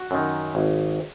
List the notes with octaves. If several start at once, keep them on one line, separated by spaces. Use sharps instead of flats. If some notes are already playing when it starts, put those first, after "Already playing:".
Already playing: F#4
F#2 D#3
G#1